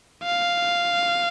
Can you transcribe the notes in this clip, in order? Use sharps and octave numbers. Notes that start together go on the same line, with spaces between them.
F5